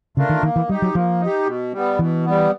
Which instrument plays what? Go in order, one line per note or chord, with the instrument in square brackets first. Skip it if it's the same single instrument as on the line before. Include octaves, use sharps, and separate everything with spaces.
[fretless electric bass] C#3 [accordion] A3 D4 F4 A#4
[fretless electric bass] D#3
[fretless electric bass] D#3 [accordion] A#3
[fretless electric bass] E3
[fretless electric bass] G3 [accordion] D#4
[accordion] G4
[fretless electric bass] F#3
[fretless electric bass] F3 [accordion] A#3
[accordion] D#4
G4
B2
G3 B3
[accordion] B2 [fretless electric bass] E3
[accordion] G3 B3